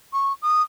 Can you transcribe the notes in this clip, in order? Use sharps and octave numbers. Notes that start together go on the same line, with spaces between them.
C#6
D#6